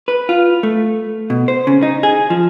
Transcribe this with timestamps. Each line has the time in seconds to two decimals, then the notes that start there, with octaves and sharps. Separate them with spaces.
0.08 B4
0.29 F4
0.63 A3
1.30 B2
1.48 C5
1.67 C#3
1.83 D#4
2.03 G#4
2.30 F3